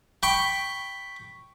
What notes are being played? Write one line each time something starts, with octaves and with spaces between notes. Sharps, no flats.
G5 B5 C#6